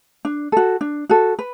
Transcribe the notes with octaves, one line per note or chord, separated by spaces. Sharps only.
D4
F#4 A4
D4
F#4 A4
B4